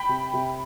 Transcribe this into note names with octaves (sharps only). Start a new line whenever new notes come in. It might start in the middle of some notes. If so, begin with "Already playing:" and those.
Already playing: G5 B5
C3
C3